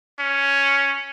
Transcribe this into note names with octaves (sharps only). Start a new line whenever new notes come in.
C#4